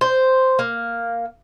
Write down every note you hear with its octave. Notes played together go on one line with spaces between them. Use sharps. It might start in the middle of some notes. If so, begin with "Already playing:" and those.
C5
A#3